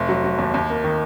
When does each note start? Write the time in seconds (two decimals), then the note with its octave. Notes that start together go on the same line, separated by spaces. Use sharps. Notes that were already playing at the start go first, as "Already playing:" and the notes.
Already playing: F1
0.09 F#3
0.24 F#3
0.38 D#2
0.54 D#2
0.70 A#3
0.84 D#3